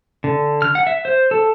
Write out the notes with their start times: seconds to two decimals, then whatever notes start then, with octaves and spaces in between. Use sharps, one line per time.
0.24 D3
0.62 F6
0.75 F#5
0.87 E5
1.05 C5
1.31 A4